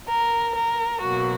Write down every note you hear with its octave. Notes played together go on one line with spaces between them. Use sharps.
A#4
A#4
B2 F#3 A#3 F#4